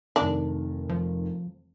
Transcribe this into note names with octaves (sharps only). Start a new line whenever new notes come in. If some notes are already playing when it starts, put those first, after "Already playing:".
F1 D#3 D4
F3